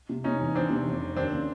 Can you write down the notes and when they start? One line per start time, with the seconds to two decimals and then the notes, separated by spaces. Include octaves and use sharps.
0.09 C3
0.24 C3 C#4 D#4
0.40 E2
0.55 E2 C4 D4
0.70 C3
0.87 F1
1.02 F1
1.16 D#2 C4 D4
1.32 C#3